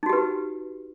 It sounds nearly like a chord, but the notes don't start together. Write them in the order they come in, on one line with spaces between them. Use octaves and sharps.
D#4 F#4 G4 B4